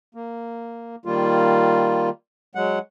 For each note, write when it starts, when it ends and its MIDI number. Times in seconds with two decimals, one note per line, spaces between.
0.15 0.96 58
1.05 2.10 51
1.05 2.10 55
1.05 2.10 58
1.05 2.10 65
2.55 2.79 54
2.55 2.79 56
2.55 2.79 78